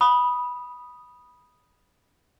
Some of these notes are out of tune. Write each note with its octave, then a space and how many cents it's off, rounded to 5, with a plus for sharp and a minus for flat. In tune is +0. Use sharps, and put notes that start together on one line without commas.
B5 -10 D#6 +0